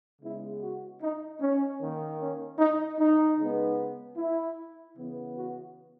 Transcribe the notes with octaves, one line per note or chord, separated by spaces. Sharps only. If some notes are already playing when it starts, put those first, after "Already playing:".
C#3 G#3 B3 E4
F#4
D#4
C#4
D#3 A#3
C#4
D#4
D#4
C#3 G#3 B3
E4
C#3 E3 B3
F#4